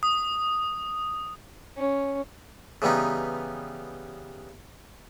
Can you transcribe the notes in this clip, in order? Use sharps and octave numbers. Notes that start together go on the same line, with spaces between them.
D#6
C#4
C#3 E3 G3 B3 D#4